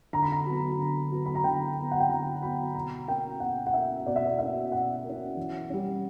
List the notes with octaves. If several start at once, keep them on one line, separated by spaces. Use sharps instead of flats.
D3 A#5
B5
A#5
F#3 B3
D3
F#3 B3
B5
A#5
D3 G5
F#3
B3
F#5
G5
D3 A#5
F#3 B3 B5
B2 A#5
A#3 C#4 G5
B2 F#5
F#5
A#3 C#4 E5
B2 D5
E5
D5
A#3 C#4 E5
B2 F#5
A#3 C#4
E3
G3 C#4